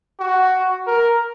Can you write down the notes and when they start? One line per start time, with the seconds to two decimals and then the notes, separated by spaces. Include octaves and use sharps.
0.20 F#4
0.87 A#4